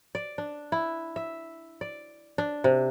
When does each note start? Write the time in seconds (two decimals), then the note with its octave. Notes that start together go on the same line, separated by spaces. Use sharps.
0.15 D5
0.38 D4
0.72 E4
1.16 E5
1.81 D5
2.38 D4
2.64 C3